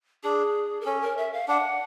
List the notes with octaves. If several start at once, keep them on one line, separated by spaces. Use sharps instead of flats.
D4 G#4
A#4
C#4 A4
A#4
E5
F5
D4 F#5